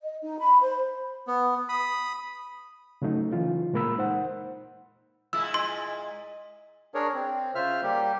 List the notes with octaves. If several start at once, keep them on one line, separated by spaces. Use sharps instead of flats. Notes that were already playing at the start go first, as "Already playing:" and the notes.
D#5
D#4
B5
C5
B3
B5 D#6
C#3 F#3 A3 D#4
C#3 E3 F4
A#2 G#3 A#3 A#4 B5 E6
D#4 C5 F#5
A#2 G#3 E4 E6
D#5 G#5 C6
D4 G#4 A#4 C#5
C4
C#3 F4 C5 E5 F6
G3 A#3 G4